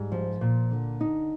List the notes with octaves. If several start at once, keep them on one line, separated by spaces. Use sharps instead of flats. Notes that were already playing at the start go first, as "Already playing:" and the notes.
Already playing: G#2 G3
F3
A#2
D3
D#4